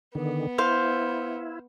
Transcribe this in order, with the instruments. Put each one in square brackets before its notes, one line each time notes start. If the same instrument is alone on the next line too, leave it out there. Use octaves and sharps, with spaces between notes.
[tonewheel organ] D3 D#3 [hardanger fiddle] B3
[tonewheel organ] E4 [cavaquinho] C5 F5